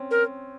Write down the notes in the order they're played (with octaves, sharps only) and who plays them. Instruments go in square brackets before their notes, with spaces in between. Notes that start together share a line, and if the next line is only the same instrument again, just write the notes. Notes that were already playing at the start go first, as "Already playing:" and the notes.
Already playing: [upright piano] C4 C#4
[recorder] A#4